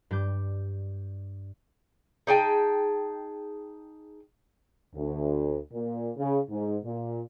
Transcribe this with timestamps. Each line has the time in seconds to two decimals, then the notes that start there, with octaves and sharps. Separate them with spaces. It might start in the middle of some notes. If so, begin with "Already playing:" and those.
0.11 G2 G3 D6 G6
2.27 D#4 G#4 G5 A5
4.95 D2
5.72 A#2
6.17 C#3
6.50 G#2
6.84 A#2